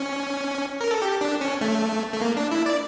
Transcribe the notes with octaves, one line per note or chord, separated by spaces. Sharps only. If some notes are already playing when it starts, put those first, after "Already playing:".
Already playing: C#4
A#4
A4
G4
D4
C#4
A3
A3
A#3
D4
E4
D5